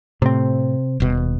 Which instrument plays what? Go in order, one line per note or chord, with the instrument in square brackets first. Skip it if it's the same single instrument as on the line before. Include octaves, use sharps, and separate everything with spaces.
[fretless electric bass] A2 [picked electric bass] C3 C4
[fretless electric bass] D#1 B2